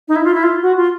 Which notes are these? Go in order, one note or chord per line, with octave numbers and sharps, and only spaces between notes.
D#4
E4
F4
E4
F4
F#4
F4